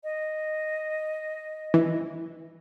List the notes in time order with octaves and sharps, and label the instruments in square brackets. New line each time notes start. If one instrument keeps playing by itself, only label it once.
[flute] D#5
[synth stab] E3